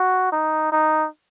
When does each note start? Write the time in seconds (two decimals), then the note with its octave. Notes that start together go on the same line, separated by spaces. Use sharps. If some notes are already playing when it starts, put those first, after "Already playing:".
Already playing: F#4
0.32 D#4
0.72 D#4